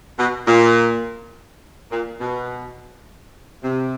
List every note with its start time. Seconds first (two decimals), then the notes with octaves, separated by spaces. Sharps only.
0.18 B2
0.48 A#2
1.92 A#2
2.20 B2
3.64 C3